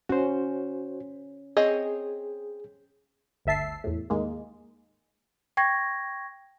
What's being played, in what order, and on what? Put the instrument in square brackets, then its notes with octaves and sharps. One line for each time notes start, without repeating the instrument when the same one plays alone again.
[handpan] C#4 [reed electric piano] F#4 C5
[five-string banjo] C4 C#5 D#5 [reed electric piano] G#4
[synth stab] G1 D2 E5 A5 C7
E2 A2
D#2 G#2 G#3 A#3
[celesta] G5 C#6 G#6 A#6